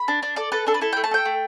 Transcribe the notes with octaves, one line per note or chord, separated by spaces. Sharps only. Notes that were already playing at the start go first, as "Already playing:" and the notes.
Already playing: B5
D4
D4
A4 D5
A4 B4
D4 A4
B4
E4 A4
A3 G5
A5
A4 G5
A3